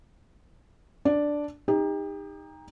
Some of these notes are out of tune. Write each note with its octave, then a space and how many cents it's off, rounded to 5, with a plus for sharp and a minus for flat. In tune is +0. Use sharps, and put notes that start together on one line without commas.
D4 +0 D5 +0
D#4 +0 G4 +35